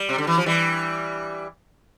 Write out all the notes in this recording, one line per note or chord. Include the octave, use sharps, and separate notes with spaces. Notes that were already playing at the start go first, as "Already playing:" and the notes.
Already playing: G3
C3
D3
E3
F3
E3 G3